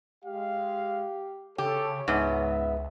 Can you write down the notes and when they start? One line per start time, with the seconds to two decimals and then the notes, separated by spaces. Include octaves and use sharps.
0.24 G#3 G4 F5
1.58 C#3 G4 A4 C#5
2.08 C#2 G#2 B3 E5